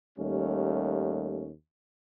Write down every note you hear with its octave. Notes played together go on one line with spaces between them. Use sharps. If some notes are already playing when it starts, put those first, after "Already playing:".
D#2 G3 A3 C#4